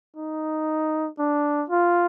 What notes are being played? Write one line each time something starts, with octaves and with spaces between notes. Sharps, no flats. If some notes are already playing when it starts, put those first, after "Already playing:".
D#4
D4
F4